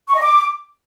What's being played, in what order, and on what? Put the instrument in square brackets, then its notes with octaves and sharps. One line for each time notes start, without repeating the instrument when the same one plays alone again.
[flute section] C#6
D#5
D6